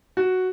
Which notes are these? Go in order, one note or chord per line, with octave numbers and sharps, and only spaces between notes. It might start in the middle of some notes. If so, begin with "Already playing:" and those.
F#4